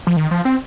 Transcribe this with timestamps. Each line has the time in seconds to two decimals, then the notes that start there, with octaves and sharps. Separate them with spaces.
0.07 F3
0.17 D#3
0.31 F3
0.45 C4